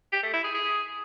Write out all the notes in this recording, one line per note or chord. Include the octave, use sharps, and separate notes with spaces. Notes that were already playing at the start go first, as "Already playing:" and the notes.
G4
A3
E4
G#4
G#4